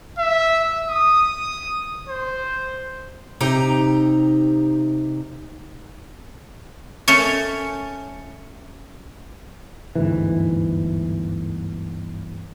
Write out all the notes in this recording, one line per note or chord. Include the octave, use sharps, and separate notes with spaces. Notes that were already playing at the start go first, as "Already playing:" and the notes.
E5
D#6
C5
C3 D#4 G4 A#5
A3 C#4 C#5
G1 D2 G#2 E3